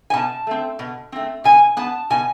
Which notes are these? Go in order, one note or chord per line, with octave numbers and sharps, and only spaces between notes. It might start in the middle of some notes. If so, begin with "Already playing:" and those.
G#5
B2 A5
A3 C4
B2
A3 C4
B2 G#5
B3 A5
B2 G#5